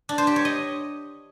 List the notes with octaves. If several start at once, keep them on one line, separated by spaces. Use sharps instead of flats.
D4
C5
G4
C#5
D#5